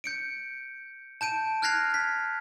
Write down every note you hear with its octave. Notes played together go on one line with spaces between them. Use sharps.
G6 C#7 D7
A5 G6 D7 D#7
F6 F#6 G#6 A#6 C7 F7
B6